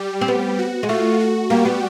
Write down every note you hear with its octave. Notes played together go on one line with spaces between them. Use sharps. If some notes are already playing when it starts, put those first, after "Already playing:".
Already playing: G3 G4
C4
B3
F#4
G#3
A3 F4
F#4
G3 A#3 G4
B3